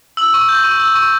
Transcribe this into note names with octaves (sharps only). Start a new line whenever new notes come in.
E6 F#7
C#6
G6
C#6
E6
C#6